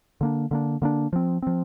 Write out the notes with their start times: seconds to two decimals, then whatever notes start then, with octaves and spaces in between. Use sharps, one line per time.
0.21 D3 A#3 D4
0.51 D3 A#3 D4
0.82 D3 A#3 D4
1.13 F3 C4
1.42 F3 C4